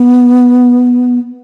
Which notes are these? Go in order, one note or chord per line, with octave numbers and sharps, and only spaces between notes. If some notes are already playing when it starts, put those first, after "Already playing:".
Already playing: B3